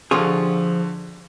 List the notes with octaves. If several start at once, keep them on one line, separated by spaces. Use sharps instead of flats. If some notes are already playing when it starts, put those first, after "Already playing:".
D3 F3 F4 G4 G#4 C#6